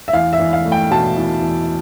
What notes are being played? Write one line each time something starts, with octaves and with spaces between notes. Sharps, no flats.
E5
E2 F5
E5
E2
F5
A3
G5
B2 A5
E2
E2